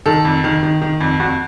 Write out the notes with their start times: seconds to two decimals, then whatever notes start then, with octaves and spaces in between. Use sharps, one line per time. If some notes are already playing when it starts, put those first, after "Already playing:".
0.06 D#3 A4
0.25 F2
0.44 D#3
0.63 D#3
0.82 D#3
1.01 F2
1.19 F2 F#4